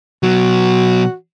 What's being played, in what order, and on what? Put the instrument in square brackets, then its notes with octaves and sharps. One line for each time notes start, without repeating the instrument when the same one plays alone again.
[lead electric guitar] B2 F#3 [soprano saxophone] F#4